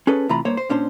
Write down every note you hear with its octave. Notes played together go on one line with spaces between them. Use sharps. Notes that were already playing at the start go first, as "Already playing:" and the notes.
C#4 G#4 A4 B4
C3 E3 A3 F4 A#5 B5
G2 A#3 C5 C#5
C5
A#2 C#4 D4 C5